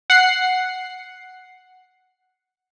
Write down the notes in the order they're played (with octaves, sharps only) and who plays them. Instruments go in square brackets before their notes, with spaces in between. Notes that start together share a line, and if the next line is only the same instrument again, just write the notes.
[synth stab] F#5 C7